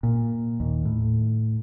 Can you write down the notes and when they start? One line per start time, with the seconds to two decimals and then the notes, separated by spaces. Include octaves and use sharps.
0.03 A#2
0.60 D#2
0.85 A2